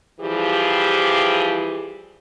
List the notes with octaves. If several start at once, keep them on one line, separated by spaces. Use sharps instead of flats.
E3 F3 G3 G4 G#4